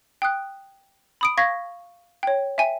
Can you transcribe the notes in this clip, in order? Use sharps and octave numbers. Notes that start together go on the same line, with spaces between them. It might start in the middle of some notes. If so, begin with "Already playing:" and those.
G5 D#6 F#6
B5 D#6 D7
F5 C#6 G#6 A#6 B6
C#5 G5
E5 G5 G#5